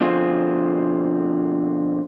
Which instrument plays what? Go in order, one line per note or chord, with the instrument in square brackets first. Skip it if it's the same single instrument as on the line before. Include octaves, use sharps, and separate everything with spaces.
[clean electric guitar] B2 D3 F3 C4 F4 G#4